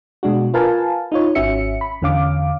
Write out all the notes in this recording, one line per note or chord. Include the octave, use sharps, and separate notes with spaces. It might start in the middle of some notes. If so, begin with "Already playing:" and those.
B2 G#3 D4 F#4
F4 A#4 B4 F5 G#5 A5
D#4 F4 C#5
G#1 C#4 F#4 E5 C#7
B5
E2 D3 C#4 F5 D6